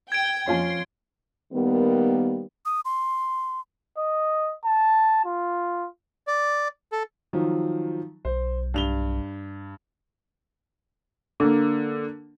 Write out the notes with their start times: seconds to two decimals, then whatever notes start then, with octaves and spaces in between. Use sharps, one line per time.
0.12 G5 G#6 D7
0.48 F2 C#4 F4 G#5 C6
1.53 D#3 G3 A#3 B3
2.66 D#6
2.85 C6
3.98 D#5
4.65 A5
5.25 F4
6.27 D5
6.92 A4
7.33 D#3 F3 F#3
8.25 B1 C5
8.74 G2 F7 G7
11.40 D3 A#3